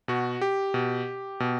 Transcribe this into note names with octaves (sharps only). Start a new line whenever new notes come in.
B2 F#4
G4
B2
B2